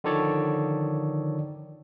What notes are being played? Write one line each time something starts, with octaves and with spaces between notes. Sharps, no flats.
D3 D#3 F3 A4 C#5 D5